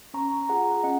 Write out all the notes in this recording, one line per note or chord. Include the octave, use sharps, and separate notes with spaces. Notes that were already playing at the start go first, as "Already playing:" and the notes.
C#4 A#5 C#6
F4 G#4 F#5 A#5
C#4 D#5 F#5